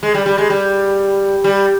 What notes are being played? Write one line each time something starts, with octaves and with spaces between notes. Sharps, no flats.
G#3
G3
G3
G#3
G3
G3